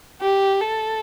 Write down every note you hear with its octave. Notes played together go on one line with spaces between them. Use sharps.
G4
A4